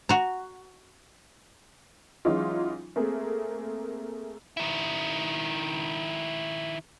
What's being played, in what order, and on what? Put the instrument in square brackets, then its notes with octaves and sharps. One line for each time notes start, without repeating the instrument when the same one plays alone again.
[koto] F#4 A#5
[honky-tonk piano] E3 F#3 G#3 C#4 D#4 F4
A3 A#3 C4 G#4
[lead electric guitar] D#3 E4